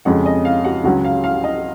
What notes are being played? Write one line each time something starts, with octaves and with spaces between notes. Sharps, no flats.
F2 C#3 G#3 F#4 F#5
D#5
F5
F#4 F#5
C#2 C#3 F#3 C#4 F#4 F#5
F5
F5
D#5